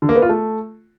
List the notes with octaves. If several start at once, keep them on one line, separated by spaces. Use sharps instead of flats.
D3
A#3
B3
F4
A3